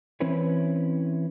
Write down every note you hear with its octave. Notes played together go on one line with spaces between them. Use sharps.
E3 C4 C#4 E4 B4 C#5